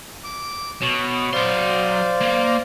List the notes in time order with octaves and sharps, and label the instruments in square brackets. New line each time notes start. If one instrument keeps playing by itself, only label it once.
[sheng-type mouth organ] D6
[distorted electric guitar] B2 [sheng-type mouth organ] C#5
[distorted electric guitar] F#3 C6 [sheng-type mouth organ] C5 D5 F5
[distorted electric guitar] A#3